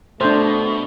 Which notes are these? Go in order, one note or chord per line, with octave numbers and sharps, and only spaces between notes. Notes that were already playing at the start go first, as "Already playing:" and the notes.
B2 A3 D4 C5